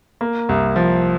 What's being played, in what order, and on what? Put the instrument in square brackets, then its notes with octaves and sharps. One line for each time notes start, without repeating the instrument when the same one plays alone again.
[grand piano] A#3
C2
F3